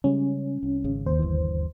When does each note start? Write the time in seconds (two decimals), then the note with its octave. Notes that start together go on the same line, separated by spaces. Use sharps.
0.04 C#3 G3 G#3 C#4
0.63 C2
0.84 G#1 C#3
1.06 D#2 C5
1.19 G1 E3